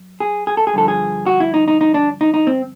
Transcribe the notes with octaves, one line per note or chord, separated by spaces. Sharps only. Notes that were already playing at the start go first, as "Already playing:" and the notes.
Already playing: F#2
G#4
G#4
A4
G#4
G2 D3 F3 A4
G#4
F#4
E4
D#4
D#4
D#4
D4
D#4
D#4
C4